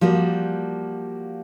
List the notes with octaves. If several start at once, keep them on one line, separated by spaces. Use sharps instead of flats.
F3 G3 A#3 F#4